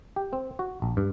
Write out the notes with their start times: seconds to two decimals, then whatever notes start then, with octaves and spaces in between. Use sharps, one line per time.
0.16 G4
0.33 C4
0.59 F#4
0.82 A#1
0.97 G2